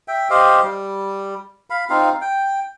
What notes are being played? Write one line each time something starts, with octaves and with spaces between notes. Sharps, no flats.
E5 G5
G4 C5 D#5 F5
G3
F5 B5
C4 D#4 F4 F5
G5